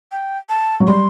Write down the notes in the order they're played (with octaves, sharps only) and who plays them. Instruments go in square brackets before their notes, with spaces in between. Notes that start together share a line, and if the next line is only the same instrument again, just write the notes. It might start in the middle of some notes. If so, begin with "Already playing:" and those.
[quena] G5
A5
[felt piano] F#3
[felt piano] G3 [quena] C6